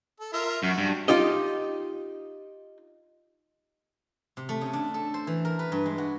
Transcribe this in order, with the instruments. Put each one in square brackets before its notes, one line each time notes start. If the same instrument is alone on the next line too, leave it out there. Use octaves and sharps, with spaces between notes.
[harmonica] A4
F4 A#4 E5
[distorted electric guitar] F#2 [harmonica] F#4
[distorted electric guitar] G2
[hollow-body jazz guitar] D#4 F4 G4 D#5
[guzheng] C3
A3
C#3
D4
A4
C5
E3
A#4
B4
G2
G#3
F#4